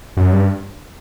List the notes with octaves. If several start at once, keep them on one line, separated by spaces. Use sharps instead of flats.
F#2
G2